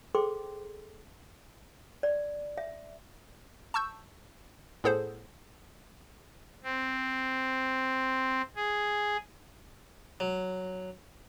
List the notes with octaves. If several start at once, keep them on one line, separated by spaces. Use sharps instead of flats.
G#4 A4 C5 G5 C6 D6
D5
E5
A5 C#6 E6 G6
A2 B3 G#4 A4 C5
C4
G#4
F#3